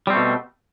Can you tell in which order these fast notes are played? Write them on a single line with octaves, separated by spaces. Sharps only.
G3 C4 A3 B2